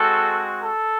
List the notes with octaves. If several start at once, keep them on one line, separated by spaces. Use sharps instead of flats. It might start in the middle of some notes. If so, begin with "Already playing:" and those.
Already playing: G#3 C4 F#4 A4
A4